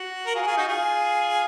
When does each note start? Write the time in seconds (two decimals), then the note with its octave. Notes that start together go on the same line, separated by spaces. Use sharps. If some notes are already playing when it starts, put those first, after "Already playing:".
Already playing: F#4
0.26 A#4
0.35 F4 G#4
0.42 F#4
0.46 F4 G#4
0.57 D#4 F#4
0.68 F4 G#4